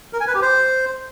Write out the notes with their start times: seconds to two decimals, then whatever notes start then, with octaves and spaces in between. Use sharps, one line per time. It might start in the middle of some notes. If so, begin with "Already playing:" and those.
0.13 A#4
0.20 G#5
0.27 B4
0.35 G4
0.42 C5